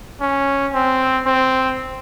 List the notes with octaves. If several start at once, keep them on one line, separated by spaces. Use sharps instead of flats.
C#4
C4
C4